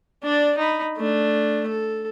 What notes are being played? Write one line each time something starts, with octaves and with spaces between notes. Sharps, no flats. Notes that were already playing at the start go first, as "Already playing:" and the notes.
D4 D5
D#4 B5
A3 D4
A4